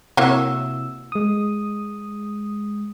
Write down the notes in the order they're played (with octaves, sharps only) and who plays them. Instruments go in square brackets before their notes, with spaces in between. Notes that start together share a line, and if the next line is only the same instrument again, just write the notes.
[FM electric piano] C3 E4 E6 [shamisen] F#3 A#3 C#5
[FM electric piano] G#3 D#6